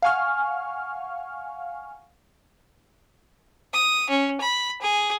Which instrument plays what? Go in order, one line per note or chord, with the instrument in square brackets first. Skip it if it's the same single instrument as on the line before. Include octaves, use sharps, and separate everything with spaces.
[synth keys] F5 F#5 G#5 C#6 F6
[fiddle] D#6
C#4
B5
G#4